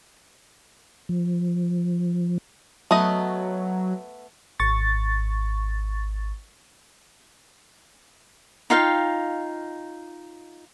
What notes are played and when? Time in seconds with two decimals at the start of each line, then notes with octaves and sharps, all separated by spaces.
1.09 F3
2.91 F#3 A3 B3 D#5
4.60 G#1 C#6 A6
8.70 D#4 F4 F5 G5